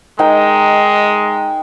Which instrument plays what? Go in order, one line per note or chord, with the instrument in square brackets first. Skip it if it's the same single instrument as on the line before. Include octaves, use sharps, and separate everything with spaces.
[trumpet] G#3 [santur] D#4 A#4 G5